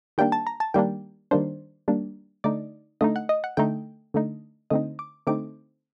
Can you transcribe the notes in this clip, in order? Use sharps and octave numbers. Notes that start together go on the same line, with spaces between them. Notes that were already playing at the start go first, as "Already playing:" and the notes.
D#3 G3 A#3 D4 G5
A5
A#5
A5
D#3 G3 A#3 D4 G5
D#3 G3 A#3 D4 C5
D#3 G3 A#3 D4
D3 A3 D#4 D5
D3 A3 D#4 D#5
F#5
D#5
F#5
D3 A3 D#4 G5
D3 A3 D#4
D3 A3 C4 D#4 D#5
D6
D3 A3 C4 D#4 D6